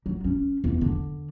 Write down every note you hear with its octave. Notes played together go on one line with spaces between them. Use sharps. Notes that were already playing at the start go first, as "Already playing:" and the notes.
F#3
C#4
E2
D3